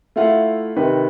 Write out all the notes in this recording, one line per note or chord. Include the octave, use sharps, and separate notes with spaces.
A3 E4 F4 F5 F#5
C3 D#3 B4